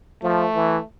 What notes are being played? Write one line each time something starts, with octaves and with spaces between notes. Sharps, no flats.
F3 A3
E3